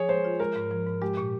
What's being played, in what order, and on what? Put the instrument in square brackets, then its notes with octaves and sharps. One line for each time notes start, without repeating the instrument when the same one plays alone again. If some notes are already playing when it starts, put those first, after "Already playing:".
Already playing: [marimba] F3 [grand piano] G#4 C#5
[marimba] G#3 [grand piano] C5
[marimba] F4
[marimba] G#3 [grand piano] A#4
[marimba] G#2
F3
G#2
[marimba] G#3 [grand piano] G4
[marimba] A#2